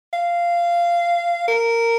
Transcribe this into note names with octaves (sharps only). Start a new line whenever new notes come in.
F5
A#4